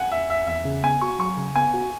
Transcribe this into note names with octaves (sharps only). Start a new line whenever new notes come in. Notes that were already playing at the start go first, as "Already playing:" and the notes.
Already playing: F#5 G#5
E2 E5
E2 E5
E2 E5
C#3
B3 G#5
F#4 C#6
F#3 C#6
C#3
B3 G#5
F#4